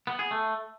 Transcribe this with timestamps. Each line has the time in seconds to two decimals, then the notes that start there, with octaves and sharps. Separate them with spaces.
0.07 B3
0.19 G#4
0.31 A3